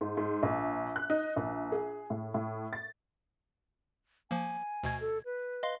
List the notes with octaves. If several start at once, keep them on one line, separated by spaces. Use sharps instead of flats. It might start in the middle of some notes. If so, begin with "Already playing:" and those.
G#2
G#2
A#1
F#6
D#4
A#1
G#4
A2
A2
A6
F3 A#3 G#5
D2 B2 G#6
A4
B4
D#5 F5 C6